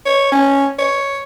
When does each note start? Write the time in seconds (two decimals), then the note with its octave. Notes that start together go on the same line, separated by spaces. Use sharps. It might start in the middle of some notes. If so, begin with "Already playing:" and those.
0.06 C#5
0.32 C#4
0.79 C#5